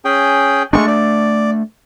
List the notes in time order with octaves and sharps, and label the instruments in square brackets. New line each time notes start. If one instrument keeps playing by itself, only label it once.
[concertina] C#4 G#4 G5
[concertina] G#3 C#6 [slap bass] A3 B3 D4
[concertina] D5